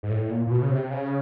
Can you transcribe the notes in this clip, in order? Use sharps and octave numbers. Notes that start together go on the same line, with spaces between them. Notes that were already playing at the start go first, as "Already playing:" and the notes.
G#2
A2
A#2
A#2
B2
C#3
C3
C#3